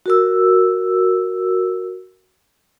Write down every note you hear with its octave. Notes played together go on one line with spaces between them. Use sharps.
F#4 A#4 E6